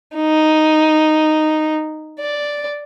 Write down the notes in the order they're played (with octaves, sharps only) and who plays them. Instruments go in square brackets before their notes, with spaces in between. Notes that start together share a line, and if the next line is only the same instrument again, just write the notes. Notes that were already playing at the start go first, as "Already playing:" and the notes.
[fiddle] D#4
D5